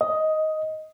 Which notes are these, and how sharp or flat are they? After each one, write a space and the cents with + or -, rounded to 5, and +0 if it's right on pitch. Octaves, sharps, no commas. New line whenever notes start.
D#5 +10